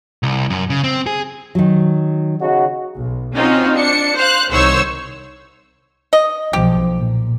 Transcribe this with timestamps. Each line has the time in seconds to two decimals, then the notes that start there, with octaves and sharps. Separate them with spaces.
0.23 C2
0.50 F#2
0.70 C#3
0.84 C4
1.07 G#4
1.55 D#3 F#3
2.41 C#3 D#4 F#4
3.00 B1
3.35 C4 C#4 D#4 F4 F#4
3.74 D4 C#7
4.17 C5 F5 F#6
4.50 C2 D#3 C5 C#5 C#6 E6
6.13 D#5
6.53 B1 F3 G4
6.95 A#2